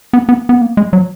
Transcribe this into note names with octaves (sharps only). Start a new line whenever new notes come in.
B3
B3
B3
A#3
G#3
F#3